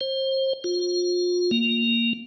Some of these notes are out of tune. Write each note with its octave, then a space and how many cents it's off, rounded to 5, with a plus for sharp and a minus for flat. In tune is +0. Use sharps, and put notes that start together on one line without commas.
C5 +30
F4 +30
A#3 -5